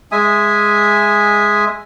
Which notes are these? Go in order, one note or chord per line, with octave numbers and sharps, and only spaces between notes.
G#3 E5 G#5 D#6